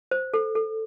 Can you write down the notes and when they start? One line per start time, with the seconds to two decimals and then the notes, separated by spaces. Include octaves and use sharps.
0.11 C5
0.34 A4
0.55 A4